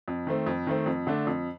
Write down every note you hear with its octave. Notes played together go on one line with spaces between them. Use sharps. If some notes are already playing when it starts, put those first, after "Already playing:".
F2
D#3 A3 C4
F2
D#3 A3 C4
F2
D3 A3 D4
F2